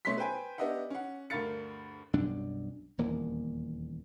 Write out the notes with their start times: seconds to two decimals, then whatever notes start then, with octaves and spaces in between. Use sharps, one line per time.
0.05 B2 A3 C#4 C#5 C6 B6
0.18 B4 C5 G5 G#5
0.58 B3 D4 G4 D#5 E5 F#5
0.90 C#4 F#5
1.30 D2 G2 A#4 F5 A6 C#7
2.13 B1 F#2 G3 D4
2.98 D#1 E2 A#3